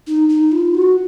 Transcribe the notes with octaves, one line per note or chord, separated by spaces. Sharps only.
D#4
D#4
F4
F#4